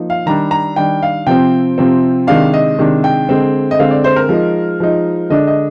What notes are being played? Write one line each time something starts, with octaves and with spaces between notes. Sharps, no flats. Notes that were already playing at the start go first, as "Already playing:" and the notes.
Already playing: F3 A#3 D#4
F5
D#3 G3 D4 A#5
A#5
D#3 G3 D4 G5
F5
C3 F3 C4 G5
C3 F3 C4
C3 D#3 G#3 D4 F5
D#5
C3 D#3 G#3 D4
G5
D3 G#3 C4
D#5
D3 G#3 C4 F5
D5
C5
A#4
F3 G#3 D#4
F3 G#3 D#4
D3 G#3 D4 D#5
D#5